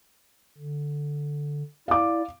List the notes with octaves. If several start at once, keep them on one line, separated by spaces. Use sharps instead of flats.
D3
E4 D5 F5 D6